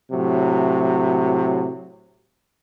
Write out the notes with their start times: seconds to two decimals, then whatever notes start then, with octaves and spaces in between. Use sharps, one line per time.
0.12 A2 C3 F#3